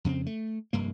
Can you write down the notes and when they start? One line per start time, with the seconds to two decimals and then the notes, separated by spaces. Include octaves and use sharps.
0.04 F2 C#3 A#3 C4
0.26 A3
0.73 F1 G2 A#3